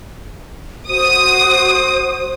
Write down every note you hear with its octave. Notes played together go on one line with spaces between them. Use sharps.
F#4 C5 D#6